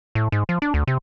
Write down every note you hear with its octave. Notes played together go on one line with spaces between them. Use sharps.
A2
G#2
F3
D4
D2
C3